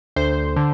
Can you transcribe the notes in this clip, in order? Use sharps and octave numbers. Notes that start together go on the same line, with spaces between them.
D2 C5
D3